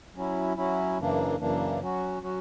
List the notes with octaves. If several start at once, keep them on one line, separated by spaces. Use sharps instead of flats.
F#3 C#4 E4
F#3 C#4 E4
F#2 C#3 E3 A#3 D4
F#2 C#3 E3 A#3 D4
F#3 C#4 F#4
F#3 C#4 F#4